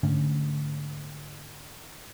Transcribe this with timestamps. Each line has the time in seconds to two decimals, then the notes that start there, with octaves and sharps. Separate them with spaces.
0.03 G#2 D3 A3 C#4